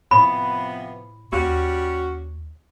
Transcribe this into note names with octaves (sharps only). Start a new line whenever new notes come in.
A2 C3 F3 B3 B5
D#2 G3 C#4 F#4